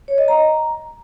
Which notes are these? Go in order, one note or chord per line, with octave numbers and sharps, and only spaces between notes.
C#5
D#5
A#5